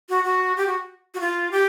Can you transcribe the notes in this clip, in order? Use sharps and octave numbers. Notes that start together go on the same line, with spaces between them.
F#4
F#4
G4
F#4
F#4
F4
G4